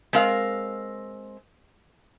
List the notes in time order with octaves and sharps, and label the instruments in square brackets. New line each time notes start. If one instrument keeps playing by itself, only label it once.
[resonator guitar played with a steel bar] G#3 C4 A#4 F5